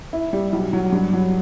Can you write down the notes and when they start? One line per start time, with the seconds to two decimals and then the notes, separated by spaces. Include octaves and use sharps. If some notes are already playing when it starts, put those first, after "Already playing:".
0.13 E4
0.33 G3
0.53 B1
0.73 F#3
0.92 G2
1.13 F#3